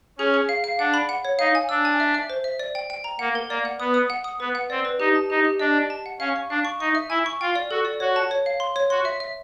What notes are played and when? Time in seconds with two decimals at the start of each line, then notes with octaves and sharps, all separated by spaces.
0.19 C#4 G#4
0.34 G#4
0.49 F5
0.64 F5
0.79 D4 F#5
0.94 B5
1.09 F#5
1.25 C#5
1.39 D#4 F5
1.55 G#5
1.69 D4 E6
1.85 G#5
2.00 E5
2.14 E5
2.30 C5
2.44 E5
2.59 D5
2.75 G5
2.90 G5
3.04 A#5
3.19 A#3 F#5
3.35 A#4
3.49 A#3 D5
3.65 F#5
3.79 B3 D#6
3.94 D#6
4.10 F#5
4.24 D#6
4.40 B3 B4
4.55 F#5
4.70 C4 D5
4.85 B4
5.00 D#4 G4
5.15 A5
5.30 D#4 G4
5.45 G4
5.59 D4 D#5
5.75 D#5
5.90 A5
6.06 F#5
6.20 C#4 F5
6.36 C#6
6.50 D4 F5
6.65 C#6
6.80 D#4 C#6
6.95 E5
7.10 E4 G#5
7.26 C#6
7.41 F4 G5
7.56 D5
7.71 F#4 A4
7.85 D5
8.00 F#4 C#5
8.16 A5
8.31 C#5
8.46 F5
8.60 C6
8.76 C#5
8.90 F#4 C6
9.05 E5
9.20 E5